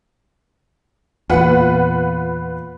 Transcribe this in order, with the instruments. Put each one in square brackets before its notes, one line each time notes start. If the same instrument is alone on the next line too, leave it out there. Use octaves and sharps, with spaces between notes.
[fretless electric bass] E2 A#2 [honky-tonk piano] F4 B4 F#5